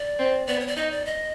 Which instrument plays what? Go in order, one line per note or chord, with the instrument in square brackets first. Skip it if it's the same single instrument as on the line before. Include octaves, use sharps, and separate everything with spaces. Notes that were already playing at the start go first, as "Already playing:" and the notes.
Already playing: [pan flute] D5
[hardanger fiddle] C4
[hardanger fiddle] B3 [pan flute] D5
[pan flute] C#5
D5
[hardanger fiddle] D#4 [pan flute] D#5
[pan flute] D5
D#5